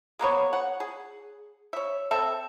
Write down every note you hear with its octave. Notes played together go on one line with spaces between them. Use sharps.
G#3 A#3 B3 C#5
C#5 F#5
G#4
C#5 E5
C4 A4 E5